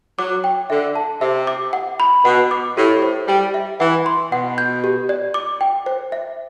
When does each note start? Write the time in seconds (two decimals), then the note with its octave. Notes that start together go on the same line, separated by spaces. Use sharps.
0.19 F#3 D6
0.44 G5
0.70 D3 E5
0.95 A5
1.21 C3 E5
1.47 D6
1.73 F#5
2.00 B5
2.25 B2 F#5
2.51 D6
2.77 A2 G4
3.02 C5
3.28 G3 G5
3.54 E5
3.80 E3 F#5
4.06 C6
4.31 B2 F#5
4.58 G6
4.84 G4
5.09 D5
5.34 D6
5.61 G5
5.86 C5
6.12 E5